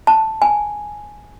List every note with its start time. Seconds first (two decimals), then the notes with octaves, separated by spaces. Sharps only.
0.07 A5
0.42 G#5